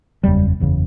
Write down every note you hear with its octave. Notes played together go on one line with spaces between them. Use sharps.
F#1 E2 C#3 G3
F#1 E2 C#3